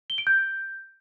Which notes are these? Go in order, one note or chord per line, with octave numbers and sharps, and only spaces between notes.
G7
D7
G6